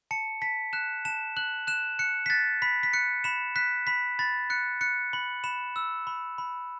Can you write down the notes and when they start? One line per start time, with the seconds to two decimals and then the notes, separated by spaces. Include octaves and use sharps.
0.11 A5 C#7
0.41 A5 B6
0.73 F#6 E7
1.05 A5 E7
1.37 F#6 F#7
1.67 F#6 E7
1.99 F#6 C#7
2.26 B6
2.30 F#6 A6
2.62 B5 B6
2.83 B6
2.93 F#6 C#7
3.24 B5 E7
3.56 F#6 B6
3.87 B5 B6
4.19 B5 A6
4.50 F#6 C#7
4.81 F#6 C#7
5.13 B5 F#7
5.44 B5 E7
5.76 E6
6.07 B5
6.38 B5